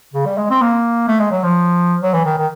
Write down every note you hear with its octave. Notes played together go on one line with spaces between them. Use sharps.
C#3
G3
G#3
C4
A#3
A3
G#3
F#3
F3
F#3
E3
D#3
D#3